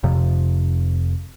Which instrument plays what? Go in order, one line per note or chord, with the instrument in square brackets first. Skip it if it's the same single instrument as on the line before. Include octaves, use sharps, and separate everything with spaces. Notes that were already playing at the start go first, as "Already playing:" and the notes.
[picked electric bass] F1 F2 C3 F3